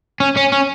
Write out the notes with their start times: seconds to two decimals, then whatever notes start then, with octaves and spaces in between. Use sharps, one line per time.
0.20 C#4
0.37 C#4
0.52 C#4